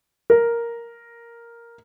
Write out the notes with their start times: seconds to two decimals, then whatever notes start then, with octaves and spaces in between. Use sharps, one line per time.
0.30 A#4